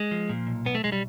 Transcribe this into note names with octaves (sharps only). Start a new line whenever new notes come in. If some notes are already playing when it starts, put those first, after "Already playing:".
Already playing: G#3
F3
A#2
B1
B1 B3
A3
B1 G#3
G3